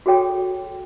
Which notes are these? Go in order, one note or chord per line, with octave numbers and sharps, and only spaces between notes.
F#4 G#4 A4 C#5 G5